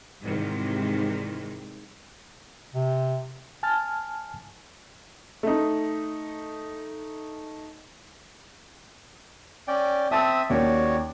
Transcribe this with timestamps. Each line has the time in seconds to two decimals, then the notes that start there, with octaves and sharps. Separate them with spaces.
0.22 G#2 C3 D#3 E3 G3 G#3
2.74 C3
3.63 G#5 A5 F6 A6
5.43 A3 D#4
9.68 C#4 D5 G5
10.11 C4 E5 A5 D#6 A6
10.50 D#2 C#4 F#4 C#5 D5 G5